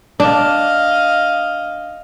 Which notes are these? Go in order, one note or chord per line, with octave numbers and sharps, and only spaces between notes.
D4 D#5 F5